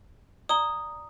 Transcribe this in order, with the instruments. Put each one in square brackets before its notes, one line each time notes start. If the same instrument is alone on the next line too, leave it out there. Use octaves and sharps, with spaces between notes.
[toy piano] D5 A#5 [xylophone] D#6 G7